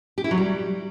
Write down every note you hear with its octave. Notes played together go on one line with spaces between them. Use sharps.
G4
E4
F#3
G3